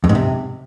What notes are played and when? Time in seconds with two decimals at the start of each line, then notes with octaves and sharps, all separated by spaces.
0.04 F2
0.09 G#2
0.15 C3